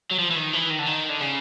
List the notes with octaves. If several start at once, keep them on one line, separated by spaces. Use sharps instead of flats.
F#3
F3
E3
D#3
E3
D#3
D3
D#3
D3
C#3